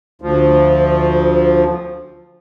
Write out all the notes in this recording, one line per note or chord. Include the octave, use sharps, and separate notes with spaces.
D2 F3